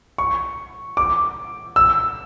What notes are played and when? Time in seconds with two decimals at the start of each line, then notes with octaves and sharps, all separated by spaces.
0.18 C#6
0.97 D6
1.76 E6